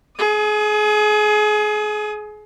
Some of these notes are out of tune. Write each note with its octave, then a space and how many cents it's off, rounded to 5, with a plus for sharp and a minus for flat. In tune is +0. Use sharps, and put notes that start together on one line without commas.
G#4 +30 D#6 +0